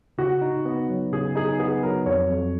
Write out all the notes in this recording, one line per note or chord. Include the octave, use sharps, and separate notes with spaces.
C#3 F#4
D#4
B3
F#3
C#3 G#4
D#4 G#4
B3 G#4
F#3 A#4
F2 C#5
F2